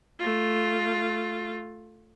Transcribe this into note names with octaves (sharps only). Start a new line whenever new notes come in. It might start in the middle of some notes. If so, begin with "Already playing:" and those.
A3 F4